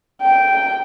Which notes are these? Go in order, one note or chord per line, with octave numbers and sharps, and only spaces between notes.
G5